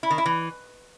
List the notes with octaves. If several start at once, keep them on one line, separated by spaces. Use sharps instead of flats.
E4
D#3
E4
E3